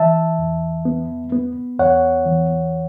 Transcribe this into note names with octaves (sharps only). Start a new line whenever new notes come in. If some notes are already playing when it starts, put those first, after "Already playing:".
Already playing: E3 E5 A5
E2
B3
B3
E2 C#5 F#5
E3